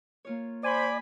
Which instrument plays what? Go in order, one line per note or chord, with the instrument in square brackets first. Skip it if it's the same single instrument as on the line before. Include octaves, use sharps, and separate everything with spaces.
[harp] A#3 F4 C#5
[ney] C5 [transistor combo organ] D5 [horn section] G#5 B5